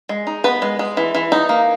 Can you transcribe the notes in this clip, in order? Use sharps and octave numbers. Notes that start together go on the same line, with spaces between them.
G#3
D#4
B3 B4
G#3
G#3
E3
E3
D#4
A#3